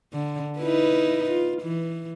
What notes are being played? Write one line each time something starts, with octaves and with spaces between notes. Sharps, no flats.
D3
D#4 E4 B4
F4
E3